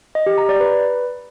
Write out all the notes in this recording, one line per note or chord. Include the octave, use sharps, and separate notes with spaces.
D#5
G4
A#5
D5
B4